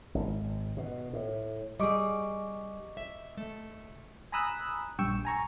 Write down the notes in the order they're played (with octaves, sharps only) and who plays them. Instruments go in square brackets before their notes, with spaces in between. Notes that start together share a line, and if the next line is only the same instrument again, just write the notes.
[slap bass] G#1
B2
A2
[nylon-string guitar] G3 G#4 [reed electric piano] D#5 C#6 D6
[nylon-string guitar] E5
A3
[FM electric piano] G#5 A#5 B5 D#6 E6 F#6
A#1 G2 G5 C#6 E6
G#5 A#5 C#6